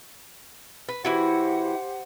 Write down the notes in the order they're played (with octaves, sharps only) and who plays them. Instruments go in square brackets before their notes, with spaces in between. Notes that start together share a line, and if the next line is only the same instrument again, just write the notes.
[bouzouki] B4
[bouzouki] E3 E4 F#4 [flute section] G4 C5 F#5